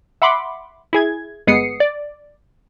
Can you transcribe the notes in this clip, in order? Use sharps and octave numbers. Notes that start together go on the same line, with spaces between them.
E5 F#5 B5 C6 D6
E4 G#4 G#6
G1 G#3 B3 D#6 C7 C#7
D5